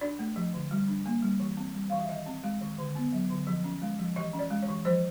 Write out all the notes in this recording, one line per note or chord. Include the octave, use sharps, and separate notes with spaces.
D4 D5
A3
F3
D3
G3
D4
A#3
G3
E3
C4
G3
E3 F5
E5
D#3 D#5
C4
G#3
D#3
D3
B3
F#3
D3
F3
C#4
G#3
F3
E3 D#5
C#4
D5
G#3
C#5
E3
F3 C5